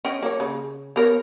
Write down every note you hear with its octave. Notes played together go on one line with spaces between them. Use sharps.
C#4 D#5 G5
A#3 C#5
C#3
B3 A#4 C#5